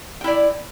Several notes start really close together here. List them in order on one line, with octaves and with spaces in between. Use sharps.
G5 E4 D5